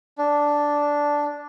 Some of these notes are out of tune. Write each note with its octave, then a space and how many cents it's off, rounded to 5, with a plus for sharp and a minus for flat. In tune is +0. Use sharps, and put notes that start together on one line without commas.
D4 -5